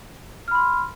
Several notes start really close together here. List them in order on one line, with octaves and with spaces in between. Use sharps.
F6 B5 C6